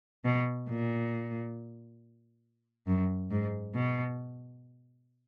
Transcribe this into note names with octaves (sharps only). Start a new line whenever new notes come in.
B2
A#2
F#2
G#2
B2